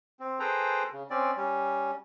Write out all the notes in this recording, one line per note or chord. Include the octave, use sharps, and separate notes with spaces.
C4
G#4 A4 B4 C5 G5 A#5
C#3
C4 C#4 D5
G3 C#4